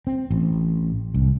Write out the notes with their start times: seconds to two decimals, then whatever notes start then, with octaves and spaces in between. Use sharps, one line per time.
0.07 C4
0.31 A1
1.14 C2